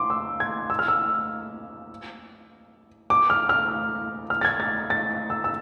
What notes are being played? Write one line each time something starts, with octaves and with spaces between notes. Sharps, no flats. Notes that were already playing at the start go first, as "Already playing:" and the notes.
Already playing: C6 D6
E6
G#6
E6
F6
E6
D6
F6
F6
F6
A6
G#6
A6
A6
E6
E6